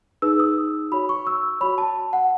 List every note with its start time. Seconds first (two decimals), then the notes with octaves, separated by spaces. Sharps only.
0.22 D#4 G#4 B4 E6
0.40 D#6
0.92 F#4 C#5 B5
1.09 C#6
1.27 E6
1.60 F#4 C#5 B5
1.78 A5
2.13 F#5